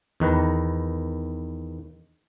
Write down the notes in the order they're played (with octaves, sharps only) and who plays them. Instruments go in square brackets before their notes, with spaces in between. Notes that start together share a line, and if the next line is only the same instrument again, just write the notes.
[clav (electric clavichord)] E2 D#3 B4 A#5